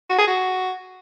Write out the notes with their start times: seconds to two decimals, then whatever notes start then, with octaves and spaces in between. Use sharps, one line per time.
0.09 F#4
0.18 G#4
0.28 F#4